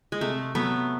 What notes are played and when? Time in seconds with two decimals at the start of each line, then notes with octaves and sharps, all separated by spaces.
0.12 G#3
0.21 C3 A3
0.55 F#3 A3 B3